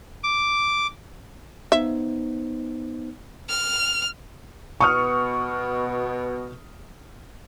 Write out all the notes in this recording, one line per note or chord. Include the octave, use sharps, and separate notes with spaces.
D6
B3 D#4 C5 E5
F6
B2 C#6 D#6 F6